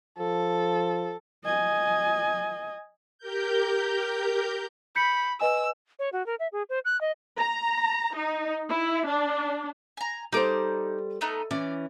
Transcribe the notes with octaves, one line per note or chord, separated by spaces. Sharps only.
F3 A4
D#5 G#5
G4 A#4 G6
B5 G6 B6 C#7
B4 D#5 G#5 E6
C#5
F#4
A#4
E5
G#4
C5
F#6
D#5
A#5
D#4
E4
D4
G#5 A#5
G3 D#4 A4 C5 D6
A3 B3 D#4
E3 C#4 D5